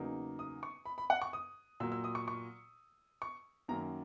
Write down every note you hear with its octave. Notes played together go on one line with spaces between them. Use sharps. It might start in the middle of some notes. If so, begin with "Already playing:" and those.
Already playing: E2 C#3 F#3 A#3 D#4
D#6
C#6
B5
B5
F#5
C#6
D#6
A#2 F#3 A#3 E6
E6
D#6
C#6
C#6
C#6
F#2 D#3 F#3 A#3 C#4 A#5